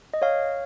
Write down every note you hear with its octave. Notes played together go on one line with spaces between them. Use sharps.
D#5
C#5 F5